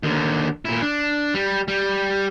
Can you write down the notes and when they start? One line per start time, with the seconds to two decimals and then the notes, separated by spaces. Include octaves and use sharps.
0.03 D#2 D3
0.65 A#2 E4
0.82 D4
1.34 G3
1.68 G3